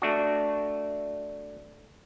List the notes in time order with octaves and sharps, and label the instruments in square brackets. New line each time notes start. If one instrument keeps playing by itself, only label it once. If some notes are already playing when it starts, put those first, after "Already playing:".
[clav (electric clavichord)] A3 D4 F#4